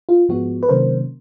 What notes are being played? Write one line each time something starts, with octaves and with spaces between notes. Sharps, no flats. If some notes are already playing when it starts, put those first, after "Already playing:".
F4
G#2 F3 G#3 B3 F#4
B4
C3 D#3 F#3 A#3 C#4 A#4 C5